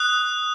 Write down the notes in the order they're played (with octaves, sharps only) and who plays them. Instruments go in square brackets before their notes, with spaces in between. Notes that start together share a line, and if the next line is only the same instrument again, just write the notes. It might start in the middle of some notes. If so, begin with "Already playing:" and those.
Already playing: [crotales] D#6 F#6